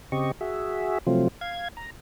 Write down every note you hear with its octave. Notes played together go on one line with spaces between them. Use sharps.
C#3 C4 G4 D#5 C#6
F#4 G#4 E5
C3 F3 F#3 A3 C4 F4
F5 G#6
A#5